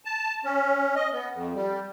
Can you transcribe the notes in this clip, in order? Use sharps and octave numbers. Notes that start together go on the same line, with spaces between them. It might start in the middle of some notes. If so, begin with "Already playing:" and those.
A5
C#4
D#5
B3
F2
G3